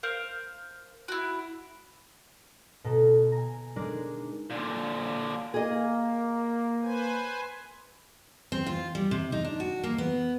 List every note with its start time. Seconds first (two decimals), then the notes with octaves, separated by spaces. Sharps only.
0.03 A#4 C5 F5
1.08 E4 F#4
2.84 B2 A4 A#5
3.32 G#5 A#5
3.76 G#3 D4 D#4 G#4 A#4
4.50 A#2 D3
5.54 A#3 G#4 D#5
6.82 B4 C5 G#5
8.52 C4
8.66 F4
8.95 G3
9.11 C3
9.32 D#4
9.45 D4
9.60 F#4
9.84 A#3
9.98 B3